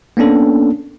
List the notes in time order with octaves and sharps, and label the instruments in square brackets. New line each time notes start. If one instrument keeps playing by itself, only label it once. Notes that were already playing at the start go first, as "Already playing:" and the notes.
[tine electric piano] A#3 B3 C#4 D4 A4